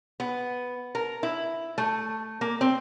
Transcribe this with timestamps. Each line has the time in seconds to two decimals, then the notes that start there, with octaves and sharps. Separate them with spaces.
0.20 B3
0.95 A#4
1.23 E4
1.78 A3
2.41 A#3
2.61 C4